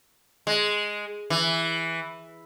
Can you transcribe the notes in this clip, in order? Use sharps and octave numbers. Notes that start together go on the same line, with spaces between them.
G#3
E3